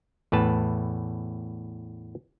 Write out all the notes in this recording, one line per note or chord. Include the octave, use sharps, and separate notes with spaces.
E2 A2 B4 A5